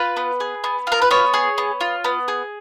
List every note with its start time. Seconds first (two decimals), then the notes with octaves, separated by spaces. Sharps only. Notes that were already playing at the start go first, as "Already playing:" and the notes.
Already playing: F4 B4
0.17 B3
0.40 G#4
0.64 B3
0.87 F4 A#4
1.02 B4
1.11 B3 C#5
1.34 G#4
1.58 B3
1.81 F4
2.04 B3
2.28 G#4